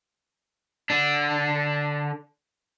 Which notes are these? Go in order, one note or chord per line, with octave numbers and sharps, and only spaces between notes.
D3 D4